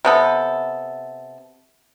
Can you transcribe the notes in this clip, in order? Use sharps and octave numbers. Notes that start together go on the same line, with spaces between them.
C3 B3 A4